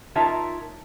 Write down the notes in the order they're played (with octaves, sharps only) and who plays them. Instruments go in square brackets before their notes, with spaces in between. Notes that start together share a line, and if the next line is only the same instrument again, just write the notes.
[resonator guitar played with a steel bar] D#4 F4 A#4 C#5 E5 A5